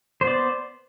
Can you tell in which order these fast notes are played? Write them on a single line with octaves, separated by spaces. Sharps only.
C5 B3 D5